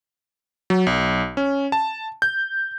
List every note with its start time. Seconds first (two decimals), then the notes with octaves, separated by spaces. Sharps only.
0.70 F#3
0.87 B1
1.37 C#4
1.72 A5
2.22 G6